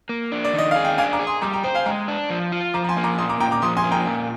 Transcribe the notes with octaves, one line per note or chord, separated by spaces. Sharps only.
A#3
D4
D5
D#3 D#5
G#4 F5
G5
D4 F5 G#5
A#5 D6
G#4
C6 D#6
G3 A#5 D6
G5 A#5
C5 G5 A#5
F5 G#5
G#3 G5 A#5
D4
F3
F4
F3 A#5 D6
A#5
G#5 C6
A#3
A#5 D6
A#2 C6 D#6
A#5 D6
A#2 G5 A#5
A#5 D6
F3 C6 D#6
G#5 C6
A#3
G5 A#5
A#2